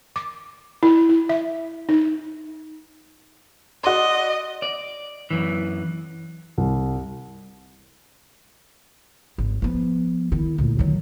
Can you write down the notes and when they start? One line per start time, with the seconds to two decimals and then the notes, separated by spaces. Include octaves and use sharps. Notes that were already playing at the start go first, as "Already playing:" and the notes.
0.16 D6
0.83 E4
1.09 E4
1.29 E5
1.89 D#4
3.84 F#4 D5 D#5 C6
4.62 D5
5.30 F#2 E3
6.58 C2
9.38 G#1
9.62 F3 B3
10.32 D#3 E4
10.58 D2 A#2
10.79 D#3 F#3